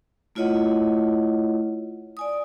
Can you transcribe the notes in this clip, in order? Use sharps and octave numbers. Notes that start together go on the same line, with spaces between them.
A3 E4 F4 C#5 D#5 F#5
D5 G#5 D#6